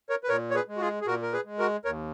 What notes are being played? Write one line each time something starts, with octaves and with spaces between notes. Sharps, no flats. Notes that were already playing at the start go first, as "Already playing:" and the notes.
A#4 C#5
B4
A#2 A#4 C#5
C#5
G#4 B4
G#3
F#4
F4 G#4
G#4
A#2 F#4 A#4
A#4
G#4 B4
G#3
F#4 A#4
D#2 A#4 C#5